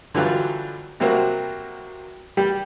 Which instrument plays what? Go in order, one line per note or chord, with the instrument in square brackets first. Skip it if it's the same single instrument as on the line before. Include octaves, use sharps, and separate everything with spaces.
[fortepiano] D3 E3 F#3 G3 F4
C3 F#3 G3 A#3 F#4 C5
G3 G4